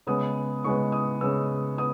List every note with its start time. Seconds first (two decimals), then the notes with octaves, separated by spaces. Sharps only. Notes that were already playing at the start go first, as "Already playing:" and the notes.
0.07 C#3 G#3 B3 D#6
0.64 C#3 G#3 B3 C#6
0.92 D#6
1.21 C#3 G#3 B3 E6
1.78 B3 D#6